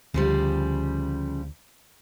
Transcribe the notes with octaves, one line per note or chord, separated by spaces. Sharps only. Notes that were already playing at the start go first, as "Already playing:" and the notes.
D2 C#3 F3 G3